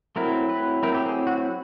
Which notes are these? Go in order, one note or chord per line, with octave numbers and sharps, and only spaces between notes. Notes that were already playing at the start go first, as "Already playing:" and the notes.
F#3 A3 C4 E4 A#4
B4
F#3 A3 C4 E4 A#4
G4
G#4
F#4